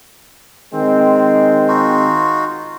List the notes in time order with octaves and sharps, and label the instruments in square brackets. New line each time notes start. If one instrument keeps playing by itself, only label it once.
[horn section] D#3 G#3 C4
[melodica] D#4 F4 F#4